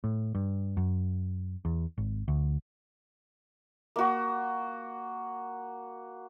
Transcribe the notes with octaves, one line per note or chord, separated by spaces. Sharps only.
A2
G2
F#2
E2
G#1
D2
A#3 F#4